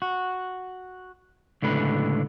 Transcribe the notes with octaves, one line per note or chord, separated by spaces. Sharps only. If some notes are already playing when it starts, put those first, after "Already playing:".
F#4
C#2 A2 D3 B4